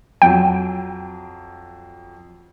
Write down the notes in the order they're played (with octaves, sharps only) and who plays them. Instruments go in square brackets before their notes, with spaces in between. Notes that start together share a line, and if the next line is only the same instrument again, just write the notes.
[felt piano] F2 F#3 [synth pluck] G5